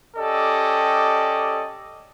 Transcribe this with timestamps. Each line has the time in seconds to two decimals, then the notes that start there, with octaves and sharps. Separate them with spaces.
0.17 C#4 G4 A4 D5 D#5